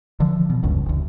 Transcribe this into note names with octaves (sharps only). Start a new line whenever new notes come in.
D3 E3 F3
B2
F1 C#2 G2 C#3
F#1 D2